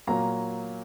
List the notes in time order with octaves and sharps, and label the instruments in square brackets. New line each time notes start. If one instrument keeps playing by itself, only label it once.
[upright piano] A#2 F#3 A#3 A#5